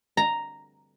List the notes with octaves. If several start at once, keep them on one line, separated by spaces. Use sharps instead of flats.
A#5